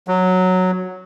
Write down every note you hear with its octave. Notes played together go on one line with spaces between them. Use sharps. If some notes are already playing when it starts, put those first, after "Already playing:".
F#3